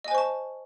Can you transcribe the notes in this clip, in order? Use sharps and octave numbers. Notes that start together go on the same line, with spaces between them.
C5 D#5 G#5 A5 C#6